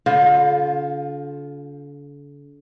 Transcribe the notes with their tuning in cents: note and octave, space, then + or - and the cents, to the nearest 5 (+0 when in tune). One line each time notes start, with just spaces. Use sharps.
D3 -40 F4 +15